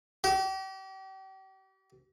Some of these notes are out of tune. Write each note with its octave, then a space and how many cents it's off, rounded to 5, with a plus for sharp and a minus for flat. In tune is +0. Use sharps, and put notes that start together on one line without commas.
G4 -40